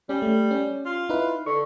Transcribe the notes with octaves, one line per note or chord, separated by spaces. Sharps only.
G3 C#4
A3
C#4
F4
D#4 E4 B4
D3 C#6